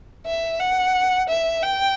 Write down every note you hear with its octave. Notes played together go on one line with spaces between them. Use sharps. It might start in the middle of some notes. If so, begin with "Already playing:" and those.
E5
F#5
E5
G5